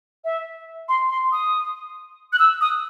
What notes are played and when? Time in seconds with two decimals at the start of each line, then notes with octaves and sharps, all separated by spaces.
0.24 E5
0.89 C6
1.10 C6
1.32 D#6
2.33 F#6
2.39 E6
2.61 D#6